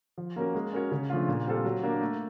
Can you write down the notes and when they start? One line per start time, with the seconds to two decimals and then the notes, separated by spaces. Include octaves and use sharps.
0.18 F3
0.36 A#3 C#4 F#4 A#4
0.55 G#3
0.73 C#4 F#4 A#4 C#5
0.91 C#3
1.09 F3 A3 D4 F4
1.28 A#2
1.46 G3 C4 F4 A4
1.65 F#3
1.83 A#3 D4
2.01 A3